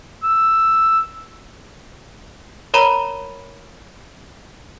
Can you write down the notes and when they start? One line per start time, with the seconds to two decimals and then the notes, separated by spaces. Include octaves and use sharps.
0.24 E6
2.74 A#4 C#5 A#5 B5 D#7 G7